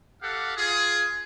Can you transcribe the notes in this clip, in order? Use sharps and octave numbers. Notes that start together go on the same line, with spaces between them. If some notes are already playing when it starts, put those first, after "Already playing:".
G4 A4 F5 F#5
F4 G#4